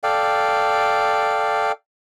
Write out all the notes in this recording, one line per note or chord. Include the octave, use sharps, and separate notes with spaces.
A4 D5 F5 G5